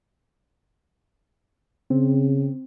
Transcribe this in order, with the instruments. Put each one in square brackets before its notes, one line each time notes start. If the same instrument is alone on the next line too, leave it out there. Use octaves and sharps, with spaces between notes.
[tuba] C#3 [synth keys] C4